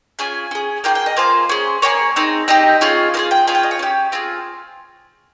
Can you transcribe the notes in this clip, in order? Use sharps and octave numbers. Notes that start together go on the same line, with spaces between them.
C#4 F4 G#4 G#5
C#4 G#4
A#3 F4 G#4 G5
G5
D#5
A#3 F4 G#4 C5
C#4 G#4
A#3 F4 G#4 C#5
C4 D#4 G#4
C4 D#4 G4 D#5
C#4 F4 G#4
A#3 F4 G#4 F5
G5
C#4 F4 G#4 G#5
G5
D#5
C#5
C#4 G4
C4 F4 G#4